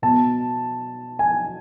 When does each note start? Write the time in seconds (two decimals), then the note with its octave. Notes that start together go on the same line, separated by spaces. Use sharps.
0.02 B2 A5
1.19 G#5